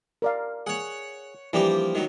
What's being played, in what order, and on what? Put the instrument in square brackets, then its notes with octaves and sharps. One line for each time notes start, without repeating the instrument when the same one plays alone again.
[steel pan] A#4 D5 F5
[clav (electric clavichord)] G#4 [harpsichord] C#5 F#5
[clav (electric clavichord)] E3 G3 D4 [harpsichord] F3 A#3 G4
[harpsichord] D#3 F#3